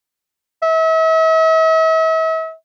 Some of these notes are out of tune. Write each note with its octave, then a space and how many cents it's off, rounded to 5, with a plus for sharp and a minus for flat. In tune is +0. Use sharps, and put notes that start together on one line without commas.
E5 -40